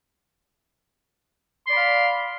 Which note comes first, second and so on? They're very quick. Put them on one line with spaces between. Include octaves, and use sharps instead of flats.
C6 D5 B5 F5